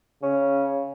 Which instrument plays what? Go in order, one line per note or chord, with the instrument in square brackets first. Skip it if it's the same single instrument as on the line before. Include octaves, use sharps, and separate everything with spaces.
[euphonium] C#3 [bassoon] C#4